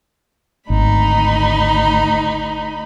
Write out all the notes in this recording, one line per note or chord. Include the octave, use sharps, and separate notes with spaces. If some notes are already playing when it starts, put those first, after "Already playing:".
G#1 D2 D#4 B5